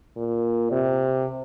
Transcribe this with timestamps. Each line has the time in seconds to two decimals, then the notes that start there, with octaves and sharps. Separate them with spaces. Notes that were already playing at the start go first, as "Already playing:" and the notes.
0.17 A#2
0.71 C3